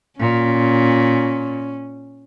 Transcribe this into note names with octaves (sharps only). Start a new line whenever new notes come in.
A#2 C#4